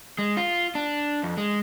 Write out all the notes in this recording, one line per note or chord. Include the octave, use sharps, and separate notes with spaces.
G#3
F4
D4
F2
G#3